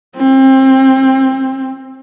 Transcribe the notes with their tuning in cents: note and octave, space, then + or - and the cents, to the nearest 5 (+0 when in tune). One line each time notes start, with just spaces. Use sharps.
C4 +25